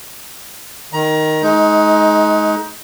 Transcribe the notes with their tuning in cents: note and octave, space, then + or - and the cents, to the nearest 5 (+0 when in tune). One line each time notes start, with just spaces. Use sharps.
D#3 +0 A#5 +25
G#3 +35 D#4 +20